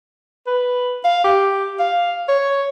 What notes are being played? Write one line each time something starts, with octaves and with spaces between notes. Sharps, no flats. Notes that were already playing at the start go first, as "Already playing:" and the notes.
B4
F5
G4
F5
C#5